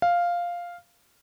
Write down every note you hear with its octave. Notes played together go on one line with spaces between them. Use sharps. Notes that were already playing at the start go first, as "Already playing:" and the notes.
F5